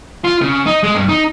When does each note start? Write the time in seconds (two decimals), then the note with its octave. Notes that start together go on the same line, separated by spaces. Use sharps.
0.24 F4
0.41 C#3
0.66 D#4
0.83 G#3
0.95 G2
1.09 D#4